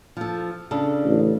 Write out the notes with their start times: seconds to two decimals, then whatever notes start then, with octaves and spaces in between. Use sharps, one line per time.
0.17 F3 A4
0.71 C#3 D4 A4
1.05 A1